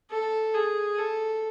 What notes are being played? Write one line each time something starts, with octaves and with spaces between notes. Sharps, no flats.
A4
G#4
A4